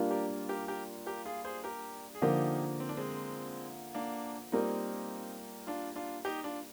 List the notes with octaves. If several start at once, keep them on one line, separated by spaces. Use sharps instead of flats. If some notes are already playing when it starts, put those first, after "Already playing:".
Already playing: G3 A#3 D4 F4
G4 A#4
G4 A#4
G4 A#4
G4 A#4
F4 G#4
G#4 C5
G4 A#4
G#4
D3 F3 A#3 D#4 F4 G4
C4
D4
G#3 C4
A#3 D4
G3 A#3 C4 D#4 F4
D4 F4
D4 F4
D#4 G4
D4 F4